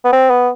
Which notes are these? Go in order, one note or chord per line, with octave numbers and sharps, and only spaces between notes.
B3
C4
B3